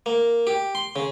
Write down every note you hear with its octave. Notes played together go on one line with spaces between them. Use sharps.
A#3
G4
C6
C#3